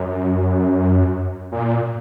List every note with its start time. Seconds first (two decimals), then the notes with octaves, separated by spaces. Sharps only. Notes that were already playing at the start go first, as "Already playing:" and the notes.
Already playing: F#2
1.52 A#2